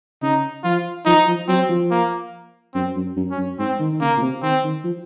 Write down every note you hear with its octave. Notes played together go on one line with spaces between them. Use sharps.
C#3 D#4
F3 F4
F3 D#4
F3
F#3 C4
F3
A#3
F#2 C4
F#2
F#2
C#4
F#2
G#2 C4
D#3
D#3
C#3 A#3
A#2
C3
D#3 C4
D#3
F3